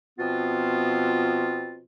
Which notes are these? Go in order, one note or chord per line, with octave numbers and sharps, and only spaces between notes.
B2 F3 B3 C4 F4